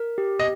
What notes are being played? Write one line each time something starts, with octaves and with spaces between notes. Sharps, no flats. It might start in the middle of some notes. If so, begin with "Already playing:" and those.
Already playing: A#4
G4
D#5